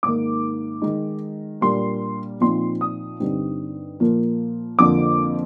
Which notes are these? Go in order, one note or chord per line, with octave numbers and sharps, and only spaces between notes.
G#2 D#3 A#3 D6
D#3 G#3 D#4
A#2 G3 A#3 D4 C6
A#2 F3 C4 D#4 C6
D#6
G2 D3 G3 C4 D#4
A#2 F3 A#3
F2 D3 F3 A#3 D6